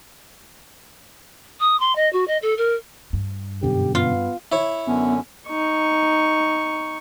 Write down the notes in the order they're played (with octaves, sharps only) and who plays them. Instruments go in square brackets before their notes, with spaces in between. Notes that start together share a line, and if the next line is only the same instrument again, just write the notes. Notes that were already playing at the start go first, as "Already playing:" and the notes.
[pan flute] D#6
C6
D#5
F#4
D#5
A4
A#4
[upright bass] G2
[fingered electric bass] F#2 B2 D3 [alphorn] G4
[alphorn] B3 [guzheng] F4
[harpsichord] E4 C#5
[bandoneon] F#2 D3 C#4 [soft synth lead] B3
[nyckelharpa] D#4 C#6